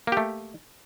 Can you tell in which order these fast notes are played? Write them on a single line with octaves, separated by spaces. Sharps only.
A#3 G4 A3